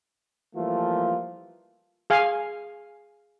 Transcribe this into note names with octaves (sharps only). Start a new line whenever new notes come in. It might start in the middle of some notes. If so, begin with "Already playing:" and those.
E3 F3 G3 A3 A#3 F4
G#4 F5 G#5